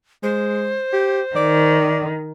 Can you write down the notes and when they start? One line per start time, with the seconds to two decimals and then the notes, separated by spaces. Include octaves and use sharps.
0.23 G#3 C5
0.93 G4
1.36 D#3 D5